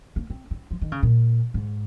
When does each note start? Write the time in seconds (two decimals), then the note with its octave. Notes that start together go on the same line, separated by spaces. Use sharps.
0.16 A#3
0.30 C4
0.51 C4
0.71 F3
0.81 D#3
0.92 C#3
1.03 A#2
1.54 G#2